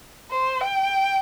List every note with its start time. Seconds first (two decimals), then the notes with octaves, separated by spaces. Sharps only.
0.31 C5
0.60 G5